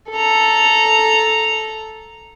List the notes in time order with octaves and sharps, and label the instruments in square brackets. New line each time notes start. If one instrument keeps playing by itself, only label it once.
[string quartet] A4 A#5